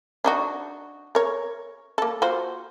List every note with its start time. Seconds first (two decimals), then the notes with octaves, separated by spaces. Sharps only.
0.24 D4 D#4 F#4
1.15 A#4 C#5
1.98 A#3 A4
2.22 F4 F#4 C5